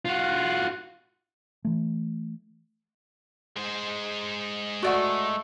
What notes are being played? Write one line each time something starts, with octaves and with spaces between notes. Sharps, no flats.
F4 F#4
E3 A3
G#3 C5
A3 F#4 D5 F#5